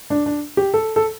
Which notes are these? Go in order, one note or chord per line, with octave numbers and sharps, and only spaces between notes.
D4
D4
G4
A4
A4